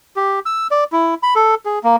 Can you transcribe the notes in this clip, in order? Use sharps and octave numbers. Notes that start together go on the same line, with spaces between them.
G4
E6
D5
E4
B5
A4
G#4
A#3